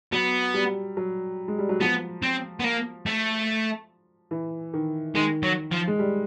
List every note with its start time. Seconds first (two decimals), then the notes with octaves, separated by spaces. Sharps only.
0.12 F#3 B3
0.54 G3
0.97 F#3
1.48 G#3
1.59 G3
1.69 F#3
1.80 F3 B3
2.23 C4
2.60 B3
2.64 A#3
3.06 A3
4.31 E3
4.73 D#3
5.15 D#3 G#3
5.43 F#3
5.72 F3
5.87 G#3
5.99 G3